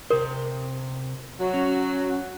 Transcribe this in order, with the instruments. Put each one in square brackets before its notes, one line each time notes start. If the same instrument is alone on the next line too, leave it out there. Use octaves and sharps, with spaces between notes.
[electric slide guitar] C3 C5 [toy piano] A#4
[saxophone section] F#3 [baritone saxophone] F#4
[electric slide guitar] C#4